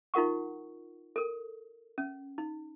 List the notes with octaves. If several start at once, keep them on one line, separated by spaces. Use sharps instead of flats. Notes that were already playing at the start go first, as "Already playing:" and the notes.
D#4 F4 A#4 F#5 C#6
A4 A#4
C#4
D#4